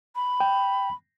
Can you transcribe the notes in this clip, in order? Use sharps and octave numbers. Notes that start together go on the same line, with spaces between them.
B5
G5